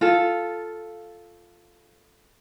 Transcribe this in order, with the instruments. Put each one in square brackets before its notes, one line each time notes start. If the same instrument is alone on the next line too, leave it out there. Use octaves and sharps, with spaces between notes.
[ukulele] F4 A4